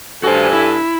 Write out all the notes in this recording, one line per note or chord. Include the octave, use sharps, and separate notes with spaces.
G2 F#4 A4 C5 G#5
E4